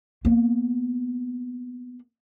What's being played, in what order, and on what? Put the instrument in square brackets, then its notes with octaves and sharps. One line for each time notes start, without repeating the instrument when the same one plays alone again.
[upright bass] A#3 B3